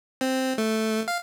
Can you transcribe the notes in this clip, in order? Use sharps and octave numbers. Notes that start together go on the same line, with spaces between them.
C4
A3
F5